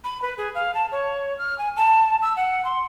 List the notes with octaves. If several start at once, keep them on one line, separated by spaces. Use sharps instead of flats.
B5
B4
G#4
F5
A5
C#5
F6
G#5
A5
E6
F#5
C6